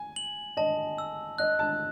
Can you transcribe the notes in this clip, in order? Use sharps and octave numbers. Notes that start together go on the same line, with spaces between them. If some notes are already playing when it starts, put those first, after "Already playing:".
Already playing: G#5
F#7
D#5 A5
E6
D#5 F#6
A5